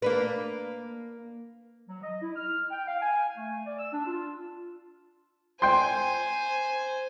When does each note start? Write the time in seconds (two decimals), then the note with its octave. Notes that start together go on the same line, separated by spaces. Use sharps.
0.02 A#3 D4 B4
1.88 F#3
2.02 D#5
2.22 E4
2.36 F6
2.71 G5
2.87 F5
3.02 G#5
3.36 A3
3.66 D5
3.79 E6
3.93 D4
4.06 F4
5.62 C5 G5 G#5 C6